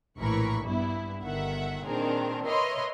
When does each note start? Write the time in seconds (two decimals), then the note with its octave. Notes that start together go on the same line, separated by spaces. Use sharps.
0.19 A#1 A2 E3 A#4 B5 C#6
0.65 G2 B3 E4
1.23 G1 D#3 E5 F#5
1.85 A#2 D#3 C4 D4 G#4 A#4
2.46 A#4 B4 C#5 D#5 E5 C6